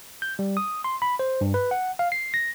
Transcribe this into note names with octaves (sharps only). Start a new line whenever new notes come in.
G6
G3
D#6
C6
B5
C5
G2
B4
F#5
F5
C7
A#6